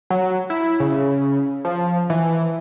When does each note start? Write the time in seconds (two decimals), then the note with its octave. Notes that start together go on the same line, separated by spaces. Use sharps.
0.10 F#3
0.50 E4
0.80 C#3
1.65 F3
2.10 E3